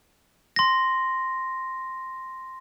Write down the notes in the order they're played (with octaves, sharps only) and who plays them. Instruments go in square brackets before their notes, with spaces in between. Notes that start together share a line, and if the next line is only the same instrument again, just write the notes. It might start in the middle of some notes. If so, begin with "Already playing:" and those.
[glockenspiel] C6 A#6